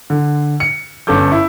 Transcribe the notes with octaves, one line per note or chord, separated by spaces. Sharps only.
D3
C#7
G1 C#4 A4 D6 G6
E4